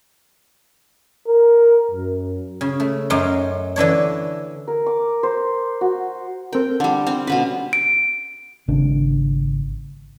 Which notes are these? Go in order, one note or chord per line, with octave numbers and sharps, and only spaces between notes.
A#4
F#2
C#3
A3
F#2 F#3 D#4 C6
D3 E3 D4 C#5
A#4
D6
C5
F#4
C4 A4 A#4 G5
D3 G3 A5
C4
B2 D3 C#4 B4
D7
G#1 C#3 D4